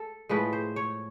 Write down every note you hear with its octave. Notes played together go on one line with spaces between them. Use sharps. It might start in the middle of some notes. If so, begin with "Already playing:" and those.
Already playing: A4
A2 F3 G#3 B4
C5
C#5